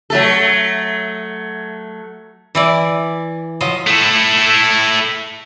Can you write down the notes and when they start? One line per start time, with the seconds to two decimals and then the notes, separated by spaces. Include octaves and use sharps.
0.10 F#3 A3 A4
2.55 E3 E4 D5
3.61 F3 F#3 F4 D#5
3.87 A3 E4